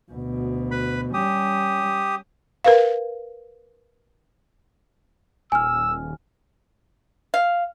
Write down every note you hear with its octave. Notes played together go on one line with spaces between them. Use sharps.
D2 B2
B4 B5
G3 C#4 G4 D#6
A#4 B4 F5
D#1 G#5 E6 F6
F5